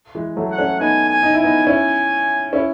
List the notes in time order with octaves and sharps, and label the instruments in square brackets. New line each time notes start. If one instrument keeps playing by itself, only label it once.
[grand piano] E3 G#3
F#3 A3
[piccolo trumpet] F#5
[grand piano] A3 C#4
[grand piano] B3 D#4 [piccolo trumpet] G#5
[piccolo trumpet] G#5
[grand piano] D#4
[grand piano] E4 [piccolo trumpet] G#5
[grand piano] B3 D#4
[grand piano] C#4 E4 [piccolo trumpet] G#5
[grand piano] C#4 E4